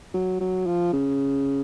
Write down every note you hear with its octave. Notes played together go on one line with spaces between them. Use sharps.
F#3
F#3
F3
C#3